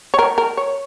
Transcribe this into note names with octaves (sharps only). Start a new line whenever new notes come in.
C#5
A#4
A#4
C#5